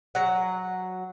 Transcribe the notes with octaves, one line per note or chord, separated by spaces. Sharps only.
F#3 F#5